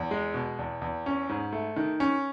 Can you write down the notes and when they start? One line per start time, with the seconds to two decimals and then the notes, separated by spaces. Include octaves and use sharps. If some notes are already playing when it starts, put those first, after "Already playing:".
Already playing: E2
0.11 G#3
0.34 B2
0.59 E2
0.82 E2
1.06 C#4
1.29 G#2
1.52 A3
1.76 D#3
2.00 C#4